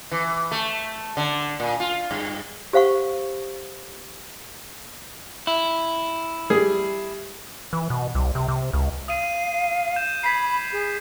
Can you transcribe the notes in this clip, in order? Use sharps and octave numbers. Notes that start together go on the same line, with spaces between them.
E3
A3
D3
A#2
F4
G2
G4 C5 F5 F#5 C#6
E4
G3 G#4
E3
B2
C2
C3
C3
C#2
F5 D#6 D#7
G6 E7
B5 G#6 B6 C7
G#4